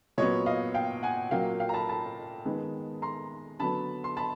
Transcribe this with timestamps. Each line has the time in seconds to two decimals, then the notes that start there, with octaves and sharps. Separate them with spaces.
0.18 A#2 F#3 B3 C#5 D#5
0.46 D#5 F5
0.74 F5 G5
1.03 F#5 G#5
1.31 A#2 F#3 A#3 F5 G5
1.60 F5 G5
1.69 A#5
1.74 A5 B5
1.89 A5 B5
2.45 D#3 G#3 B3
3.02 A#5 C6
3.59 D3 F#3 B3 A5 B5
4.04 C6
4.17 A5 B5